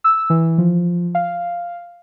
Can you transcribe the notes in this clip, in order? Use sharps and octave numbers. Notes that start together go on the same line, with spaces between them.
E6
E3
F3
F5